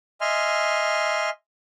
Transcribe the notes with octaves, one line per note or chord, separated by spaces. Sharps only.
D#5 E5 G#5 C6 F6